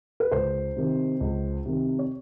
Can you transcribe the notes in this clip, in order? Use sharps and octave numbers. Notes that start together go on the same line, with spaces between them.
B4
C#2 C5
C3 D#3
C#2
C3 D#3
C#5